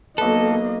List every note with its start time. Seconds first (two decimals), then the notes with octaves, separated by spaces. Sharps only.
0.18 B1 A#3 A4 B4 D#5